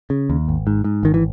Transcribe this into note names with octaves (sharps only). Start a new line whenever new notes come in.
C#3
D#2
G#1
G#2
G#2
G#1 D#3
E3